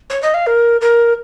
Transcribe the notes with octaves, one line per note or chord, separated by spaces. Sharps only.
C#5
D#5
F5
A#4
A#4